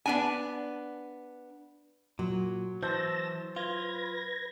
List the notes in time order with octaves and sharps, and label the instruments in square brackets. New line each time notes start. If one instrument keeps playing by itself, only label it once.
[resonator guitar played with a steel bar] B3 D4 G#5
[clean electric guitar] A#2 [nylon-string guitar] F#3
[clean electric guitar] E3 [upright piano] C5 G6 [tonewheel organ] A5 E6 A#6
[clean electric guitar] F4 [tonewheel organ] B4 G#6 A#6